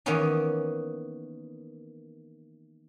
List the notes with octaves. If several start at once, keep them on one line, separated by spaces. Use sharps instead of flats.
D#3 E3 A#3 B3 C#4 D#4